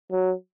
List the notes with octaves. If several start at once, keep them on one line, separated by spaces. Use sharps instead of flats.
F#3